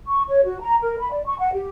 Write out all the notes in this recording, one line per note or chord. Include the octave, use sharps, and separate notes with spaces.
C#6
C#5
F#4
A#5
A#4
B5
D5
C#6
F#5
G4